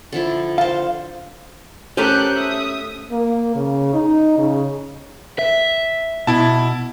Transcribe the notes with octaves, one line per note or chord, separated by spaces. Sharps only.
D3 F3 E4
C5 F5 A5
A3 C#4 G4 A4 A#4 C5 F#6 G6
E5 D#6
A#3
C#3
D#4
C#3
E5
B2 E4 A5